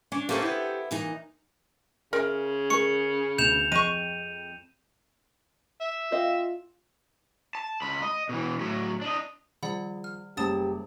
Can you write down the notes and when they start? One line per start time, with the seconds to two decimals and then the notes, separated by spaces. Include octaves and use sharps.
0.12 C#4 D4
0.29 A3 A#3 C#4 G4 A4 C5
0.42 B3 E4
0.91 A#2 E3 D#4
2.13 C#3 A#4 E5 G#5 C6
2.70 G#3 C#4 A#4 C#6 C#7
3.38 D2 B3 G6 E7 F7
3.72 F2 G#3 C#6 D#7
5.81 E5
6.12 C4 F4 D#5 F5
7.55 A5
7.82 C#2 B5
8.02 D#5
8.29 B2 E3
8.60 A2 F#3
9.02 D4 D#5
9.63 D#3 F3 G3 D5 F#5 B5
10.04 F6
10.37 F#1 G3 G#3 C#4 G4 A5 D#6 A6